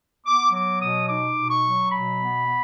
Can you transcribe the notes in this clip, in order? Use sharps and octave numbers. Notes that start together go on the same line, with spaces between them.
B3 D6
F#3 D6
B2 D#6
D#4 D6
B2
C#6
F#3
B2 B5
B3
B3